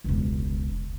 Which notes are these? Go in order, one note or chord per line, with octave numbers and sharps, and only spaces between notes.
E1 C#2